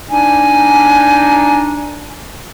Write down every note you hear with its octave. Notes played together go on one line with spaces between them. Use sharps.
D4 D#4 G#5